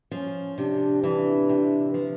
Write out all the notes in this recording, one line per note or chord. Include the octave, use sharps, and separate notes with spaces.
F3 C#4
C3 D4
E3 D4
C3
F3